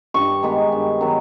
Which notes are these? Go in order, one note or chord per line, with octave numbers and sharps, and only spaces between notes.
G2 C#6
D#3 G#3 B3
G2
D#3 F#3 B3